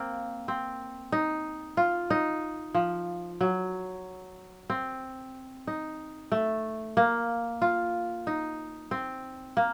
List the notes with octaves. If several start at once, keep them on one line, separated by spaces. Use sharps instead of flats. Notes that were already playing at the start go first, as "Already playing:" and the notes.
Already playing: A#3 C4
C4
D#4
F4
D#4
F3
F#3
C4
D#4
A3
A#3
F4
D#4
C4
A#3